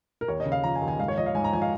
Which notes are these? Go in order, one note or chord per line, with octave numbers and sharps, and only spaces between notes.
A#4
D#2 C#5
D#5
C#3
F5
F3 A#5
G#5
D#2
G#5
G#2 F5
C#5
F3 D#5
F5
G#2 G#5
A#5
F3 G#5
F5